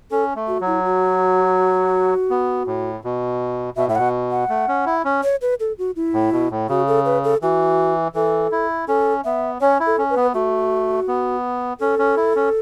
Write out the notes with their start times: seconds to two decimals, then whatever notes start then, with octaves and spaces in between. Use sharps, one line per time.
0.11 C#4 A4
0.36 A3
0.48 F#4
0.61 F#3
0.66 E4
0.85 F#4
2.30 B3
2.67 A2
3.04 B2
3.77 B2 E5
3.87 A2 E5
3.95 B2 F#5
4.31 F#5
4.49 A3
4.68 C#4
4.86 E4
5.05 C#4
5.23 C#5
5.42 B4
5.60 A4
5.78 F#4
5.96 E4
6.14 A2
6.32 B2
6.51 A2
6.69 C#3 F#4
6.88 A4
7.05 B4
7.24 A4
7.42 E3 F#4
8.15 E3 A4
8.52 E4
8.88 C#4 A4
9.25 B3 E5
9.61 C#4 C#5
9.80 E4
9.86 A4
9.98 C#4
10.10 B4
10.16 B3
10.34 A3 F#4
11.08 B3
11.80 C#4 A4
11.99 C#4
12.17 E4
12.36 C#4